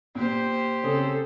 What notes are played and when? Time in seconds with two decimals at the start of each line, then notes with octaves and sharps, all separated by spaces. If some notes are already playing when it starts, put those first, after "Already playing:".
0.15 A#2 G4 C5
0.83 C#3 C4 G#4 A4